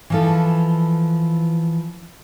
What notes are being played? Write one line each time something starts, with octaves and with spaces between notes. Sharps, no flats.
E3 F3 A4